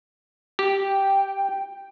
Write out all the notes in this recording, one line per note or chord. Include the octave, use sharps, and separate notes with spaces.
G4 G5